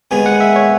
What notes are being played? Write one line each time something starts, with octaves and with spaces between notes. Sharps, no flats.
D#2 D#3 G#3 B3 G#5
F#5
E5
C#5